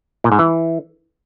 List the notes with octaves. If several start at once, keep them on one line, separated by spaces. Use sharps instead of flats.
A#2
G#2
E3